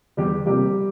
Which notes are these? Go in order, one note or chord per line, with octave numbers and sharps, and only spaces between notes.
E2 G3 G4
C3 F3 G3 A#3 G4